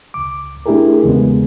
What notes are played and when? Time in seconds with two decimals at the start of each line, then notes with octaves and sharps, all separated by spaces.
0.14 C#2 D6
0.66 A3 D4 E4 G4 G#4 A#4
1.04 E2 C#3 G#3 B3